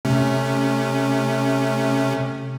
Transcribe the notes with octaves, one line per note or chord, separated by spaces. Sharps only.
C3 A3 C#4